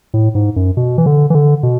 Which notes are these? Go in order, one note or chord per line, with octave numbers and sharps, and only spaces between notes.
A2
G#2
F#2
B2
E3
D3
E3
D3
B2